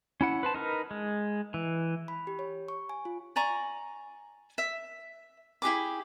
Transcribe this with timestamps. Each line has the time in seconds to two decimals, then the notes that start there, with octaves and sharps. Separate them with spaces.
0.21 C#4 E4 F#5
0.43 B4 C5 A5
0.54 D#4 A#4 B4
0.91 G#3
1.54 E3
2.08 B5
2.27 G4
2.39 C#5
2.68 C#6
2.89 G#5
3.05 F4
3.36 D5 G#5 A#5 C#6
4.58 E5
5.62 E4 G4 G#4 D6